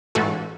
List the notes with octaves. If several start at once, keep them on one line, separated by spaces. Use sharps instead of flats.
A1 G#2 E3 A3 F#4 A4